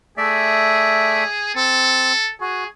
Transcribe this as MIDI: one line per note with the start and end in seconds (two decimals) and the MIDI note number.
0.17 1.24 57
0.17 1.51 68
0.17 1.24 74
0.17 1.24 76
1.55 2.13 60
1.55 2.31 69
2.41 2.64 66
2.41 2.67 68